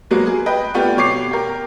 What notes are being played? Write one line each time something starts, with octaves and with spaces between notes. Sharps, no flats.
F#3 G#3 A#3 B3 F#4
G#4
B4 D#5 G5
G3 A3 B3 F4 G4
B2 C#5 D6 C7
G4 A#4